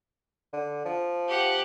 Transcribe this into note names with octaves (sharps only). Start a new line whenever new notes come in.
D3
F3
G4 F#5